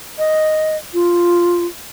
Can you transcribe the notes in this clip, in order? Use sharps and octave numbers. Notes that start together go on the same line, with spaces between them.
D#5
F4